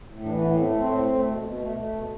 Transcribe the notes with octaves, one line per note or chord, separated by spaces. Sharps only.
A2
E3 D4
A2 B3
A3 C4
A2 C4
A3
A3
B2
B2
A3
A3
B2